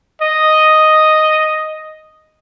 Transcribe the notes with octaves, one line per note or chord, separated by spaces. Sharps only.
D#5